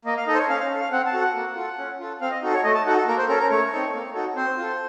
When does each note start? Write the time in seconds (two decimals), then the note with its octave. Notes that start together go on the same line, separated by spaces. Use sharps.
0.05 A#3 D#5
0.17 F5
0.27 D#4 A4 D#5
0.34 C5
0.38 C#5
0.49 C#4 F5
0.60 F5
0.70 A4
0.81 F5
0.91 C4 F#5
1.06 A5
1.13 F#4 A4
1.21 F#5
1.35 A#3
1.56 F4 A4
1.78 C#4
1.99 F4 A4
2.21 C4 F5
2.31 D#5
2.42 D#4 F#4 A4
2.54 C#5
2.64 A3 D#5
2.75 A5
2.86 D#4 F#4 A4 F#5
2.96 A4
3.07 A#3 A#4
3.18 C5
3.29 C#4 A4 A#4
3.39 A#4
3.50 A3 C#5
3.72 C4 D#4 A4
3.93 A#3
4.14 D#4 F#4 A4
4.36 C4 C5
4.58 F4 A4